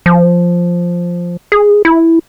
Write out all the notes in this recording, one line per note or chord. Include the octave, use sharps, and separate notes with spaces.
F3
G#4
E4